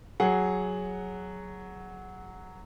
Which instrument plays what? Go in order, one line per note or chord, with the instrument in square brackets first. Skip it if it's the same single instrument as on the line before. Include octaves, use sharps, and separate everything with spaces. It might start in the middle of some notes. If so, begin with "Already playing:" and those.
[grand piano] F#3 G#4 F#5